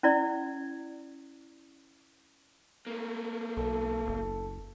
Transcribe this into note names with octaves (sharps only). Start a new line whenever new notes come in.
C#4 E4 D5
A3 A#3
B1 A4
F#1